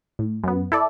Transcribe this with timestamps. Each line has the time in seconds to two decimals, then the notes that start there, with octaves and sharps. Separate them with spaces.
0.19 A2
0.44 F#2 B3
0.72 E4 A4 D5